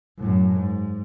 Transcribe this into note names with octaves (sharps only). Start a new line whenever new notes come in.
F#2 A2
G#2